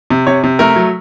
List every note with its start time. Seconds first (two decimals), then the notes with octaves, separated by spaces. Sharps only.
0.10 C3
0.26 C3 C#5
0.44 C3
0.59 A3 A#4
0.76 F#3